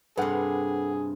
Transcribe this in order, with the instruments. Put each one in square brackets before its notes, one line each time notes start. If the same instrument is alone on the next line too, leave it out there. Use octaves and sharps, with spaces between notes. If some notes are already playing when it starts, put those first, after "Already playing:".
[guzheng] G2 C3 [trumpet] G#4 [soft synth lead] A4 [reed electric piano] B4 F#5